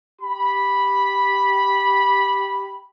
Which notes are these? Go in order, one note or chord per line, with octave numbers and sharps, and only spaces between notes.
G4 B5